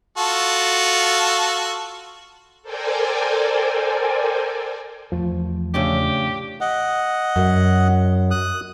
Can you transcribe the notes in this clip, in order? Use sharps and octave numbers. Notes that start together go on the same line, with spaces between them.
F4 F#4 A4
A4 A#4 C5 D5 G5 G#5
E2 F3 A3
A2 C#3 D4 G4
D#5 F#5
F#2
D#6 F#6